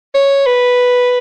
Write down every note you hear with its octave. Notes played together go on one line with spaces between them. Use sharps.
C#5
B4